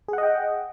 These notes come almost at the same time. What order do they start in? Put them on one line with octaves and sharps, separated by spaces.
G#4 F#5 D#5 G5